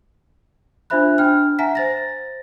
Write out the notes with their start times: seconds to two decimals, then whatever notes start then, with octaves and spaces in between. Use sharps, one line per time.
0.90 D4 F4 C5 E5 B5 F#6
1.18 D4 G5 F6
1.59 E5 F#5 G#5 A#5 B6
1.75 C5 A6 A#6